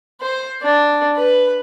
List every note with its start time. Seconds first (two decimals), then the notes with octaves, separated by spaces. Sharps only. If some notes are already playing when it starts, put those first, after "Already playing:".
0.21 C5
0.62 D4
1.16 B4